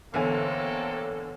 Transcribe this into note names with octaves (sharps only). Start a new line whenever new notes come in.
B1 D3 E3 A#3 C4 A4 C#5 G#5